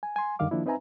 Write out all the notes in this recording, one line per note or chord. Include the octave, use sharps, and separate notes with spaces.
G#5
G#5 C6
F#2 D3 D#3 G3 F5 D6
D#3 F3 A#3 D4 E4
C4 D#4 B4 E5 G#5 A#5